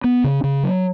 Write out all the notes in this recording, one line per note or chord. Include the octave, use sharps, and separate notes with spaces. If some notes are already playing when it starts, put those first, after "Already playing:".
B3
C#3
C#3
F#3